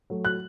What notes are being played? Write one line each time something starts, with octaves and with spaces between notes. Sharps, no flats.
F#3 A3
F#6